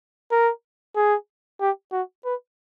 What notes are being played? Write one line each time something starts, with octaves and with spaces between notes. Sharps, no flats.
A#4
G#4
G4
F#4
B4